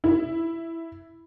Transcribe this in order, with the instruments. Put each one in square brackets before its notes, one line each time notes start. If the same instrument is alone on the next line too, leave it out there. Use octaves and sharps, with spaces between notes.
[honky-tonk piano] E4